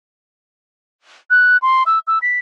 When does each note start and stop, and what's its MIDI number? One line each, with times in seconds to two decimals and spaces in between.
1.30 1.57 90
1.62 1.83 84
1.86 1.99 88
2.07 2.19 88
2.22 2.39 95